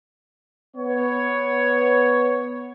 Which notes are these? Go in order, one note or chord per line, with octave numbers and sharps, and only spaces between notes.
B3 C#5